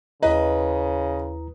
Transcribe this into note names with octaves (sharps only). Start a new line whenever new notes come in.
D#2 C#3 E4 B4 D#5 A#5